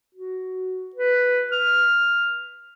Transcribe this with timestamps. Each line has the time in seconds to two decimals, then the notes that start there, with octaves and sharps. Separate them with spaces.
0.15 F#4
0.95 B4
1.52 F6